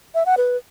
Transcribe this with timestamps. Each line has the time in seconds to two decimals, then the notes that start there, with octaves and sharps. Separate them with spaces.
0.15 E5
0.26 F#5
0.37 B4